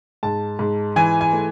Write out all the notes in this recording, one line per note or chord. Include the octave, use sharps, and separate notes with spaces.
G#2 A5
G#2
E3 G#5
G#5
A3